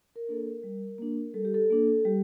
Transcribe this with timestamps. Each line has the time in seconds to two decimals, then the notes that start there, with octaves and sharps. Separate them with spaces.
0.16 A#4
0.28 A#3 D4 A4
0.40 A#4
0.63 G3
0.98 A#3 D4
1.34 G3 A4
1.45 G4
1.54 A4
1.70 A#3 D4
2.05 G3 G4